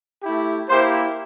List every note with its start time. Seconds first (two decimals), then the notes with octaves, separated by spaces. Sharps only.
0.23 A3 E4 G4
0.68 A#3 E4 G4 C5